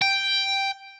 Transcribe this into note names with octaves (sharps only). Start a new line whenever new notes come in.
G5